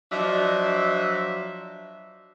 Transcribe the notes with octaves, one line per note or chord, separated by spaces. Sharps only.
F3 F#3 D4 D#5 E5